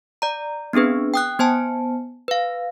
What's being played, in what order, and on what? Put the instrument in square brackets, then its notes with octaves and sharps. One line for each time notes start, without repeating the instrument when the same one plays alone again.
[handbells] D5 A#5
B3 C4 D4 G#4 B4
G5 D#6 F#6
B3 C5 G#5 A5
B4 F5